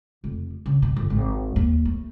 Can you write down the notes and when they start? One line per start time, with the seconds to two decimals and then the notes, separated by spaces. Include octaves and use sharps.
0.24 F1
0.66 C#3
0.82 B2
0.96 G1
1.10 G#1
1.56 D#2
1.85 A3